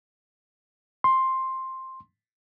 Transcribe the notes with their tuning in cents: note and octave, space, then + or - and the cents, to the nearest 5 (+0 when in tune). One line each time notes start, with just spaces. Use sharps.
C6 +5